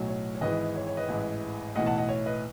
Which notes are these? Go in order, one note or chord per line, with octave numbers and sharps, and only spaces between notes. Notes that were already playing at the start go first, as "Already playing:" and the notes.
Already playing: B1 A2 F#3
C#5
C#5
G#1 G#2 E3 B4 D#5
C#5
C#5
B4 D#5
A1 G#2 E3
B1 A2 E3 D#5 F#5
F#5 A5
D#5 F#5
C#5
B4 D#5